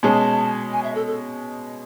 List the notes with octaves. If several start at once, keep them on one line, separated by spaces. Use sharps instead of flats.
B2 G#3 C#4 A5
G#5
E5
A4
A4